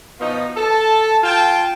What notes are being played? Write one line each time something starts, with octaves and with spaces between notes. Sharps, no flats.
B2 F3 D#4
A4 A5
F4 G5 A5